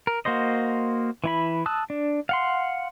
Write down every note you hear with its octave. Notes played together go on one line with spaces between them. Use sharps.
A#4
A#3 F#4 C5 D#5
E3 E4 B5
A5 D#6 E6 F#6
D4
F5 F#5 C6